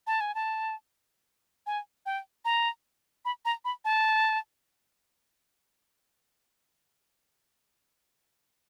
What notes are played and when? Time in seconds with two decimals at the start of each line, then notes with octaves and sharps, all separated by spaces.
0.07 A5
0.21 G#5
0.35 A5
1.67 G#5
2.06 G5
2.45 A#5
3.25 B5
3.45 A#5
3.65 B5
3.85 A5